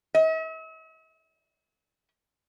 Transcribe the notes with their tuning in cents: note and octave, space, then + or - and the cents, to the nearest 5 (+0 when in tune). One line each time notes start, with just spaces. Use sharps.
E5 -45